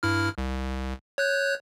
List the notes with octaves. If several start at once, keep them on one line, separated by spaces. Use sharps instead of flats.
G2 E4 F6
C2
C#5 F#6 G6